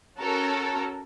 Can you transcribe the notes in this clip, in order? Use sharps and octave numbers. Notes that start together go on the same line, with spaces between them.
C#4 F#4 A4 A#4